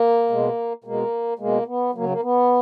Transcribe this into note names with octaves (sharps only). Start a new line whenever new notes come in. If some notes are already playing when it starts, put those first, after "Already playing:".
Already playing: A#3
B2 G#3
B2 G#3 A#3
B2 G#3 A#3
B3
C#3 F#3 A#3
A#3
B3